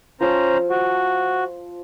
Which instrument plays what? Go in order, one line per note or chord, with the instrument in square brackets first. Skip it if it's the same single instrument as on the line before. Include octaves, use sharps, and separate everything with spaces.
[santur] F3 E6 [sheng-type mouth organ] C#4 C5 A#5
[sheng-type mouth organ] F#4